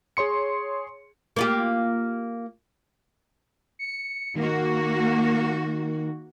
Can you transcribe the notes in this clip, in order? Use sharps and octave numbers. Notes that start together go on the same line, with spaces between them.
G#4 C#5 C6 C#7
A#3 F4 G4
C#7
D#3 A#3 F#4